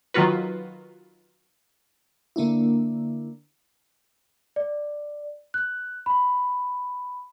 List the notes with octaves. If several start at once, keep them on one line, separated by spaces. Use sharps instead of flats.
D#3 F#3 F4 F#4 B4
D3 A#3 D4 E4
D5
F#6
B5